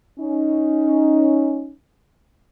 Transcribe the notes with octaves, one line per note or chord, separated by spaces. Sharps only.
C#4 D#4